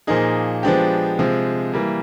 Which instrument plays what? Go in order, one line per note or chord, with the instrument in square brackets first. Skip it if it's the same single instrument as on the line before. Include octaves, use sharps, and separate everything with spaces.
[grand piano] A#2 F3 A#3 D#4 G#4
F3 G#3 B3 D4 G4
C3 F3 G#3
E3 G3 A#3